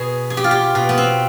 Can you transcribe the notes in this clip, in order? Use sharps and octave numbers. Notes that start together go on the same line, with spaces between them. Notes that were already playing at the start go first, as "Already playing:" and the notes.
Already playing: B2 G#4
G#4
G4
F4
G4
B2 F4
B3
C4